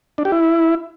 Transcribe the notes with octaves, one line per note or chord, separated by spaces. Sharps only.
D4
G4
E4